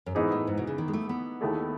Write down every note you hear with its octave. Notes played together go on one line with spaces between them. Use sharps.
F#2
G#2 E3 B3 D#4 G#4
A2
G#2
B2
C#3
D#3
G#3
A3
B3
D#2 D#3 A3 E4 G#4